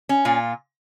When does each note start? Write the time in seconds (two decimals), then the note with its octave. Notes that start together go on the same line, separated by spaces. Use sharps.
0.09 C#4
0.25 A#2 F4